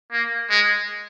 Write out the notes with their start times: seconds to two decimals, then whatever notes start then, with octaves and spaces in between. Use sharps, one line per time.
0.12 A#3
0.50 G#3